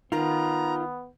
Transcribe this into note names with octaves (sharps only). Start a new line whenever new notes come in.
D#3 B3 F4 A#5